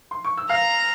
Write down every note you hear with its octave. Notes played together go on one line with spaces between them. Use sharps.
C6
C#6
E6
F5 A#5 F6